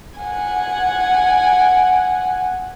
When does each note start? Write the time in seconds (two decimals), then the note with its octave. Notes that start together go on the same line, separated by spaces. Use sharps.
0.20 F#5 G#5